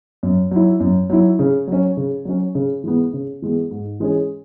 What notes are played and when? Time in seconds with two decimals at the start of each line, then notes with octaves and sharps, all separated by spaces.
0.23 F#2
0.51 F#3 E4
0.80 F#2
1.10 F#3 E4
1.39 C#3
1.67 F#3 C#4
1.97 C#3
2.25 F#3 C#4
2.55 C#3
2.84 E3 G#3 B3
3.13 C#3
3.42 E3 G#3 B3
3.71 G#2
4.00 E3 G#3 C#4 G#4